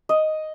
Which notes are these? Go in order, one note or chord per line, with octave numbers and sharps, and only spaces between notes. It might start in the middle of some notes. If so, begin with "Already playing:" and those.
D#5